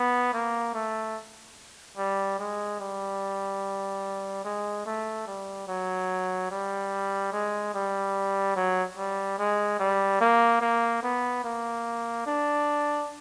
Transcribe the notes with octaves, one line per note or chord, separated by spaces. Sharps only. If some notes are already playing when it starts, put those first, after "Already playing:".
Already playing: B3
A#3
A3
G3
G#3
G3
G#3
A3
G3
F#3
G3
G#3
G3
F#3
G3
G#3
G3
A#3
A#3
B3
A#3
D4